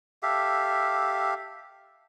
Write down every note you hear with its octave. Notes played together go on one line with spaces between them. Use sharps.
G4 A4 E5 F5